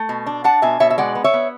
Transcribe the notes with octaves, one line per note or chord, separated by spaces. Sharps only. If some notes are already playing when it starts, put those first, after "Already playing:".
Already playing: A3
B2
D4
D4 F#5 A5
B2 E5 G#5
B2 C#5 E5
E5
G#3 D5 F#5
B3
C#5 E5
B3